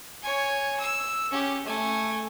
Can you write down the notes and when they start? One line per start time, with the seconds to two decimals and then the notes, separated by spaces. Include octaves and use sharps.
0.23 C#5 G#5
0.79 E6
1.31 C#4 G4
1.66 A3 G#5